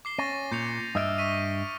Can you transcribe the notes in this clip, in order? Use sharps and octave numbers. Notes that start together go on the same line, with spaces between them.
D6 C7 G7
C#4 A6 A#6 D#7
A#2 G6 C#7 F7
G2 D#5 E5 D#6 F6 D7
C#6 B6 D#7